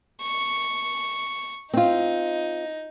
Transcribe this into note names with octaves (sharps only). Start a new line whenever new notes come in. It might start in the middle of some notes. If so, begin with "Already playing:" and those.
C#6
C4 D#4 F4